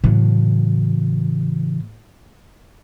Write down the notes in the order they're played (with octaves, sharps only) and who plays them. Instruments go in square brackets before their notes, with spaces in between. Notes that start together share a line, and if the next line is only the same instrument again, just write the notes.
[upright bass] A2 [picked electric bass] C#3 E3 F#3